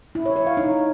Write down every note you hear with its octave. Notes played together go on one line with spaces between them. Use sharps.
E4
C#5
C#5
F5
D#4